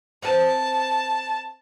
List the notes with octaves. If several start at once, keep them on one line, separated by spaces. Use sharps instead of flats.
C4 B4 A5